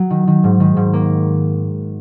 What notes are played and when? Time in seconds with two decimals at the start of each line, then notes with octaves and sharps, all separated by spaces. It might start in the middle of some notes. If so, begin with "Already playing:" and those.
Already playing: F#3
0.10 D#3
0.27 D#3
0.44 G#2
0.60 D#3
0.77 G#2
0.93 A#3